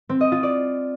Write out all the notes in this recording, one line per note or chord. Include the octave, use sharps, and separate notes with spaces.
C4
D#5
F4
D5